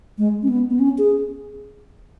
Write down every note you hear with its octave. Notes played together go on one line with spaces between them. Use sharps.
G#3
C#4
B3
B3
C#4
G#4